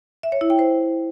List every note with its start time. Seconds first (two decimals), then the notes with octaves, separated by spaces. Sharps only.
0.23 E5
0.32 C#5
0.41 E4
0.50 G5
0.59 C5